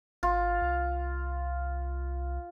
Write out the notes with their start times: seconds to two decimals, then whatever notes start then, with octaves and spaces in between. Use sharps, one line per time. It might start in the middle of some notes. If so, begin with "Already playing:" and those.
0.23 G#1 F4
0.62 C2